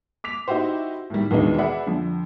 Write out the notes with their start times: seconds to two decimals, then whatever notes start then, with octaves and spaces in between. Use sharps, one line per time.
0.24 D6 B6 F7
0.48 D#4 E4 F#4 G4 C5
1.10 A2 D#3 G3
1.31 D#2 B2 E3 G#3 D4 D#4
1.58 G#4 B4 D5 E5 F#5
1.87 F2 D3